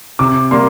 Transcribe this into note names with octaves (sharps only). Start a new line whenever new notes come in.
C3 D6
G3 A#3 C6